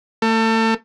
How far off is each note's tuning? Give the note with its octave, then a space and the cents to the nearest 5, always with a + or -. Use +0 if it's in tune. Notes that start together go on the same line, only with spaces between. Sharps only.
A3 +30